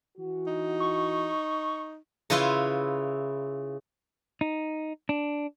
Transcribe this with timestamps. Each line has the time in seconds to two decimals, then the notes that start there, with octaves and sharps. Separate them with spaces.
0.17 E3 F#4
0.47 D#4
0.80 C#6
2.30 C#3 E4 F4 B4 E5 C6
4.41 D#4
5.09 D4